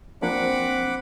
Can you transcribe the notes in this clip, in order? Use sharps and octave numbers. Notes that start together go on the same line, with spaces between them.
F3 A#3 C4 D4 F#5 B5 D6